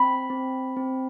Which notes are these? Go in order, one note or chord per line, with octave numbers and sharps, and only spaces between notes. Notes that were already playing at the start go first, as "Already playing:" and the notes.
Already playing: C4 B5
C4
C4